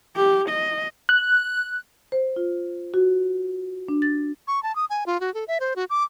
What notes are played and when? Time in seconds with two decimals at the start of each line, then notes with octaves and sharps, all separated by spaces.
0.17 G4
0.49 D#5
1.09 F#6
2.12 C5
2.36 F4
2.94 F#4
3.89 D4
4.02 A6
4.47 C#6
4.63 A5
4.76 D#6
4.90 G#5
5.06 F4
5.21 F#4
5.34 A4
5.48 E5
5.60 C5
5.76 F#4
5.90 D6